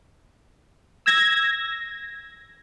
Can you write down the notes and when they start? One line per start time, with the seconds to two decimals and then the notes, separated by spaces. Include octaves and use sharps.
1.06 E6 G#6 A#6